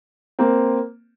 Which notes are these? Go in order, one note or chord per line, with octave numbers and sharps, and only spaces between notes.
A#3 C4